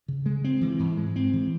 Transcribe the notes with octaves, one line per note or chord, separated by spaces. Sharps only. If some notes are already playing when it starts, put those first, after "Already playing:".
C#3
G#3
C4
E3
G#2
G#3
C4
E3